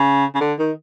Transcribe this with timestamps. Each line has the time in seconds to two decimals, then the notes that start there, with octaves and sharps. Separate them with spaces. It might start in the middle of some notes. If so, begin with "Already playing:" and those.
Already playing: C#3
0.35 C#3
0.41 D3
0.59 D#3